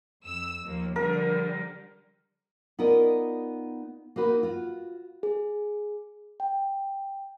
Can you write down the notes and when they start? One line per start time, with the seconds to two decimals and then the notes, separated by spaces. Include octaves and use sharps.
0.24 F2 E6
0.65 D#2 F3 A#3
0.96 D3 F3 G3 A#4
2.79 B3 D#4 F4 A#4 D5 D#5
4.16 A#3 D#4 F#4 B4
4.43 F4 F#4
5.23 G#4
6.40 G5